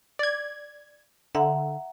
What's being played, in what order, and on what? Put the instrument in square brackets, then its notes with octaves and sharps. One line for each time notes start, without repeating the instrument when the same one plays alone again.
[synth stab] D5 G#6
[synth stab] D3 [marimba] E5 F#5 A#5